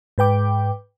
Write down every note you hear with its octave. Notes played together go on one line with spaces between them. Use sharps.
G#2 B4 G5 D6